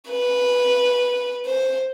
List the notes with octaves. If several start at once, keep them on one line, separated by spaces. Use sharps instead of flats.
B4
C5